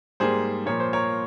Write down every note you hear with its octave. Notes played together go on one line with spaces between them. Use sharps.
G#2 G3 A#3 G#4 C5
A#2 F3 A#3 C#5
C5
A#4 C#5